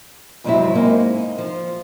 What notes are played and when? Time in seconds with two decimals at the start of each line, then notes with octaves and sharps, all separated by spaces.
0.44 F2 G#2 C3 F#3 C4 E4
0.75 G#3 A#3 C4 D#4
1.18 D#4
1.38 F3